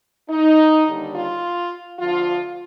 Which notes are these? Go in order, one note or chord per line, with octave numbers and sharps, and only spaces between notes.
D#4
D#2 D3 G3
F4
D2 D3 F3 F4